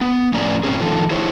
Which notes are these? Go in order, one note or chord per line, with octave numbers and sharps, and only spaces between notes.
B3
A2 F3 C#4 G#4 D5 A#5
G#2 C4 C#4 G#4
D#3 F3 A4
E4 G#4 C5 C#5